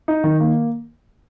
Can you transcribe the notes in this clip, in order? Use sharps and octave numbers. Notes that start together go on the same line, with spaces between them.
D#4
D#3
A#3